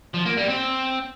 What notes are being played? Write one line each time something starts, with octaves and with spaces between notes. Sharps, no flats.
F3
A#3
G3
C4